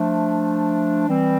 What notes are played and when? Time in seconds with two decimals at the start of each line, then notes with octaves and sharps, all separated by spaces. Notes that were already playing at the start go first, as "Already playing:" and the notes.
Already playing: F3 A3 D4
1.08 E3 G3 C4